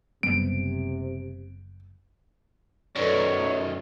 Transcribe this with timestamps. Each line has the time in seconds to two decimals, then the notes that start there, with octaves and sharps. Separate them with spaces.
0.23 F#1 C3 G3 B3 D7
2.96 F#2 D#3 A4 B4 C#5 D5